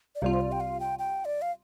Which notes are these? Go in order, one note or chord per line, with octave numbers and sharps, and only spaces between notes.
D5
C2 C3 G3 F4 F5
C5
D5
G5
F5
G5
G5
D5
F5